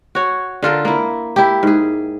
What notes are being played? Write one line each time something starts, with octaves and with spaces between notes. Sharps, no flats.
F#4 C#5
D3 F4 A4 A#4
A#3 E4
E4 G4
G#2 G#4